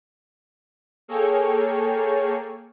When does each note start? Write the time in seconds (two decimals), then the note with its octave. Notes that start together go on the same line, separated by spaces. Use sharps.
1.08 A#3 G#4 A4 C#5 G5